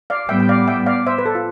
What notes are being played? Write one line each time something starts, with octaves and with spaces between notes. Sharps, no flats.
D5 F5
A2 G3 B3 E5 G5
G5
D5 F5
E5 G5
D5 F5
C5 E5
B4
A4
F4